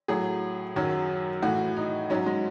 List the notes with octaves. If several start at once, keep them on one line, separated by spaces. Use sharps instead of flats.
A2 F#3 G#4
F#2 D#3 F#3
A2 E3 F#4
D#4
G#2 F#3 C#4
G#3